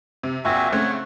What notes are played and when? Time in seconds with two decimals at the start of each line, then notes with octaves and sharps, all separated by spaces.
0.23 C3
0.45 A#1 A#2 C4 F#4 E5 G#5
0.72 C#3 A3 C4 C#5 F#5